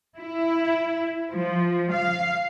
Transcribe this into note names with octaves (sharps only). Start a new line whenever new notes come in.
E4
F3
F5